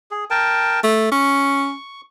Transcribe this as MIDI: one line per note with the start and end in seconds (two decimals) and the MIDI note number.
0.11 0.25 68
0.30 0.80 70
0.30 0.80 79
0.30 0.80 81
0.84 1.09 57
1.12 1.73 61
1.12 2.01 85